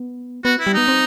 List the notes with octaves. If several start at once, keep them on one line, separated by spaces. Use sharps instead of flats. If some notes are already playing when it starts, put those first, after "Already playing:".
Already playing: B3
B3 F#4
E4
G3
B3 D#4
C4